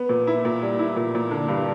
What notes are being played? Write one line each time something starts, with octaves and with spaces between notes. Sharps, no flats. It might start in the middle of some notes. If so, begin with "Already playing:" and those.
Already playing: B3
A#2
E4
A#2
G3
E4
A#2
A#2
D3
G2